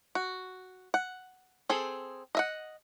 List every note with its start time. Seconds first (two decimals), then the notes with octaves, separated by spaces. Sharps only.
0.15 F#4
0.94 F#5
1.70 C4 G#4 A4
2.35 D#5 E5 F#5